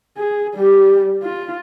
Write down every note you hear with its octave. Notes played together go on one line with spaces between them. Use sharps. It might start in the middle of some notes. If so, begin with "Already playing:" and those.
G#4
G3 G4
F4